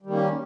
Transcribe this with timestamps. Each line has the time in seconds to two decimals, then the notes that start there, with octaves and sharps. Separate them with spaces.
0.02 G3
0.06 D#3
0.10 A#3
0.14 C#4